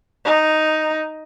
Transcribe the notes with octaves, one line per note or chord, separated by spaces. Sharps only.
D#4